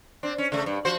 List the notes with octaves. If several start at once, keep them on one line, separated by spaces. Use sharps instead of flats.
C4 D4
C#4
C#3 A3
G2
F3 F#4 C5